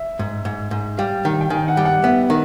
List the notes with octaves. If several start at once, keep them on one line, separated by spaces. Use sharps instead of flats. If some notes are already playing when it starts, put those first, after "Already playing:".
Already playing: E5
G#2
G#2
G#2
G3 F5
D#3
G5
D#3 G#5
F#5
G3
F#5
B3 E5
D#3